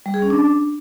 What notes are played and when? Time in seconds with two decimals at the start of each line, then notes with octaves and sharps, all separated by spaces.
0.06 G3
0.14 G#4
0.22 C#4
0.30 D4